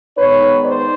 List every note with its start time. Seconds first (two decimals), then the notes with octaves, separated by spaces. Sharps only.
0.18 D#3 G#3 B3 D#4 B4 C#5
0.63 C5 D5